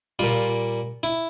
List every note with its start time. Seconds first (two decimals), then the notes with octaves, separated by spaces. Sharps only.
0.19 A#2 G3 F4
1.03 E4